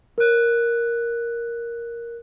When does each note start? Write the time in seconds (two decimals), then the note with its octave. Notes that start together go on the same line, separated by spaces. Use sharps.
0.18 A#4 F#6